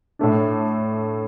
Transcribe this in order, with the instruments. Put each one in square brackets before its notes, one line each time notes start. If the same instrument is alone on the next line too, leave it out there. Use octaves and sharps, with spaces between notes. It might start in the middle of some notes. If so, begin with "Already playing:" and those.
[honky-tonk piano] A2 A3 D4